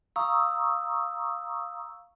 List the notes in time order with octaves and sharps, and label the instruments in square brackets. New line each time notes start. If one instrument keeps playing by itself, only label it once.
[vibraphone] F5 A#5 C#6 D#6 E6